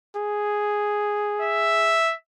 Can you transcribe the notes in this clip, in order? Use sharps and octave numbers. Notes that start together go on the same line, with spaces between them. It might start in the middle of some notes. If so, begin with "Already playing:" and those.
G#4
E5